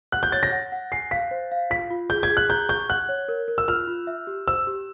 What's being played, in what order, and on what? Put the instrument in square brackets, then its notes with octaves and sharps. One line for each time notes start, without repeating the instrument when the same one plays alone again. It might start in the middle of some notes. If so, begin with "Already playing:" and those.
[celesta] F#5 [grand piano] F#6
[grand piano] G6
[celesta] C#5 [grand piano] A6
[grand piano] A#6
[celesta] F#5
F#5
[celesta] G#5 [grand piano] C7
[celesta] F5 [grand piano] B6
[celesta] C5
F5
[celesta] F4 [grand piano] B6
[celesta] F4
[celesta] G#4 [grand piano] G6
[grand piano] G#6
[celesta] G#4
[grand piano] F#6
[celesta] A#5 [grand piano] G6
[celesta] C#6 [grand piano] G6
[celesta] F#5 [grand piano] F#6
[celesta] C#5
A#4
A#4
[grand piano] E6
[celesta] F4 [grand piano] F6
[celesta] F4
E5
G4
[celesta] C5 [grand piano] E6
[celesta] G4